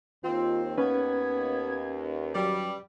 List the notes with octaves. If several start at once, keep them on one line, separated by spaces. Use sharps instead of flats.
D#2 C4 F4
B3 C#4 B4 G#6
F#3 G3